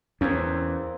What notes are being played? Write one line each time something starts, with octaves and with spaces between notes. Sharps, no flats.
E2 A#3 C4 C#4